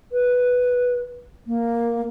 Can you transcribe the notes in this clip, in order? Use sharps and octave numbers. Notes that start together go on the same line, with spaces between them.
B4
A#3